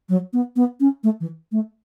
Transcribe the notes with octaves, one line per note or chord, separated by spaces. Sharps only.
F#3
B3
B3
C#4
A3
E3
A3